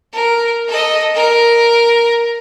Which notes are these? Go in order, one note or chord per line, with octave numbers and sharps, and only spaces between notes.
A#4
A4 D#5
A#4